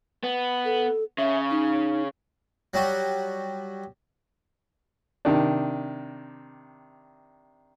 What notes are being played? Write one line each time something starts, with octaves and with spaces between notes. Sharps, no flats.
B3
A4
C#3 E5
D#4
F#3 G3 F#4
C3 D#3 D4